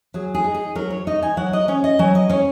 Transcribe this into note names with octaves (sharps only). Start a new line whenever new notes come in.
F#3 G#4
G#4
D#4
G#4
F#3 A#4
C#5
D#4 D#5
G#5
F#3 F#5
D#5
C#4 C#5
D#5
F#3 G#5
D#5
C#4 C#5